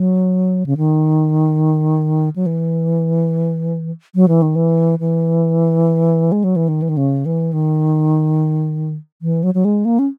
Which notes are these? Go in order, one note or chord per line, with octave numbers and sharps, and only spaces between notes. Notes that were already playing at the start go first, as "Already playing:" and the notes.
Already playing: F#3
C#3
D#3
F#3
E3
F#3
E3
D#3
E3
E3
G#3
F#3
E3
D#3
E3
D#3
C#3
E3
D#3
E3
F#3
F#3
G#3
A#3
C#4